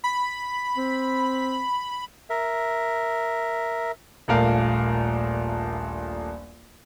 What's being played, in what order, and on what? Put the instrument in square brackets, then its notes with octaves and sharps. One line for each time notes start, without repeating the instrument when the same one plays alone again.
[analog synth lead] B5
[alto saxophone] C4
[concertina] A#4 E5
[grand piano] D#1 A#1 A3 A#4 F5